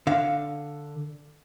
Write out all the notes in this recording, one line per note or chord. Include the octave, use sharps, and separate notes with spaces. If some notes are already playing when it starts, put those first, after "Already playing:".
D3 F5